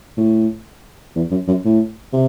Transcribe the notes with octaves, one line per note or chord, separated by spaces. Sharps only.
A2
E2
F#2
F#2
A2
C3